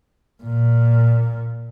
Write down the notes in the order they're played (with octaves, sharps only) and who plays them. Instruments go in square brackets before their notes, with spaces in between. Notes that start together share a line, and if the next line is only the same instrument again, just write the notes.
[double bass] A#2